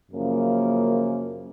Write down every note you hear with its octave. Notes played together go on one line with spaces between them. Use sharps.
F#2 C#3 F3 A#3